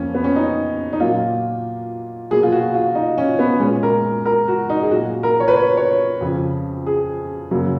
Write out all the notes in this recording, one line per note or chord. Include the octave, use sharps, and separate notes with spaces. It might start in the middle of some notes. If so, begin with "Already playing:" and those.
Already playing: F2 F3 A#3 C#4
B3
C#4
D#4
D#4
A#2 F#3 A#3 F4
B2 F#3 A#3 G#4
F4
F#4
F4
D#4
C#4
B3
A#2 G#3 C#4
A#4
A#4
F#4
D#4
G#4
A#2 F#3 A#3 F#4
A#4
C#5
B4
C#5
C#5
F2 C#3 F3
G#4
F#2 C#3 F#3 A#3